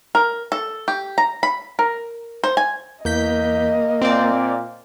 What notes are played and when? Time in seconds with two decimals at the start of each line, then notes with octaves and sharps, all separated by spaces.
0.15 A#4
0.52 A4
0.88 G4
1.18 A#5
1.43 B5
1.79 A#4
2.44 C5
2.57 G#5
3.05 E2 A#3 D#5 G6 B6
4.02 A#2 C4 D5